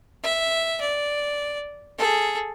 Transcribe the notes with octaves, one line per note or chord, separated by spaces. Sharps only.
E5
D5
G#4 A4